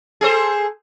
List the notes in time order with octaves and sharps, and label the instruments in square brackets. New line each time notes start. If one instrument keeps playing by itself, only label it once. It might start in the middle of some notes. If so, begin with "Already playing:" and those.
[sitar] G#4 A4 C5